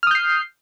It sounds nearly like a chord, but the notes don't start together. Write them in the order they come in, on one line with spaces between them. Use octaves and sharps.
F6 D#6 G6 C7